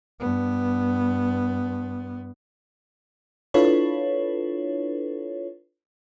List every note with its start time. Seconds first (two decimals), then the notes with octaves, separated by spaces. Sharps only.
0.20 G2 B3
3.54 D4 E4 F4 A4 B4 C#5